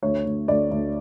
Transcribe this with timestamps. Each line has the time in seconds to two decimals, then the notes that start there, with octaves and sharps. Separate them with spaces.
0.02 D2 C#5
0.25 D2
0.48 D2 D5
0.71 D2